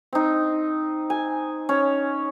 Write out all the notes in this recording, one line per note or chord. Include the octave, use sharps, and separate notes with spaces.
C4 D#4
G#5
C#4